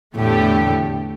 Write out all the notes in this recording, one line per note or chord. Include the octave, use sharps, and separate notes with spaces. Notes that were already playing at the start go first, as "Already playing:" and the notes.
E2 A2 D3 A3 G4